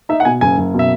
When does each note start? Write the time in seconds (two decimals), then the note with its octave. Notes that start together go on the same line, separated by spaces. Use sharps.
0.09 D#4 E5
0.20 F#5
0.25 B2 G#5
0.41 F#1 G#5
0.58 F#1
0.74 B2
0.79 E5